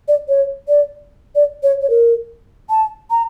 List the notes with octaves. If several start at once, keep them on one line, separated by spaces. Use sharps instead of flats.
D5
C#5
D5
D5
C#5
C#5
A#4
A5
A#5